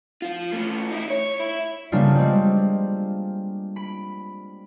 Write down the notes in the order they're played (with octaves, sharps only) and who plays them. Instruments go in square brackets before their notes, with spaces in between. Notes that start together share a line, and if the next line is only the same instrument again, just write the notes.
[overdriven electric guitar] F3 F4
A3 C#4
D#4 E4
C#5
E4
[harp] C#3 G3 A#3 B3 D4 F4
G3 G#3 C4
B5 D7